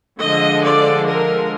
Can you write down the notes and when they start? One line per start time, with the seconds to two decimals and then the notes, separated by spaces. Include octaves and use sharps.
0.21 D3 F3 G#3 D#5
0.64 D5
1.08 A#4